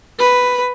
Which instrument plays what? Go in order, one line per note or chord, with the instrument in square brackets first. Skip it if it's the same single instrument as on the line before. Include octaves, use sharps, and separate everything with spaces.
[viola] B4